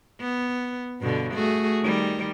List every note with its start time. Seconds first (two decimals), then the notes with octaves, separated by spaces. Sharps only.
0.20 B3
1.00 G2 B2 D3
1.33 A3 F#4 G#4
1.82 D#3 G3